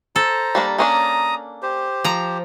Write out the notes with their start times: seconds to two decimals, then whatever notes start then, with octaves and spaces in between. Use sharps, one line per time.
0.16 A4 C5 A#5
0.55 G3 A#3 D4
0.78 A#3 C#4 D4 A#5 D#6
1.63 G4 C5
2.04 F3 A#5